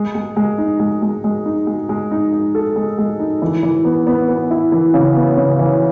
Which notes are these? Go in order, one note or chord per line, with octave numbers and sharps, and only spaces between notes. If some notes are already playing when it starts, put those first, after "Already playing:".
Already playing: G#3
G#3
G#3
D#4
G#3
G#3
G#3
D#4
G#3
G#3
D#4
D#4
A4
G#3
G#3
D#4
E3
E3
B3
B3
B3
E4
E3
C#3
B3
C#3
E3